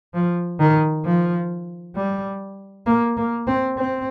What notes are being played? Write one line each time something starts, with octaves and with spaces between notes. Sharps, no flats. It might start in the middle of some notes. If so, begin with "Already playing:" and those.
F3
D#3
F3
G3
A#3
A#3
C4
C4